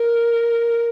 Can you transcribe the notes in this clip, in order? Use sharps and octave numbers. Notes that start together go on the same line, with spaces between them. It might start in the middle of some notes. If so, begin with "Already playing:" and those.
Already playing: A#4